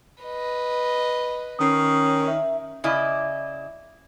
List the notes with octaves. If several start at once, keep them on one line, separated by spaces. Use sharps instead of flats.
B4 D#5
D#3 C#4 D#6 C7
E5
C#3 E4 D5 D#5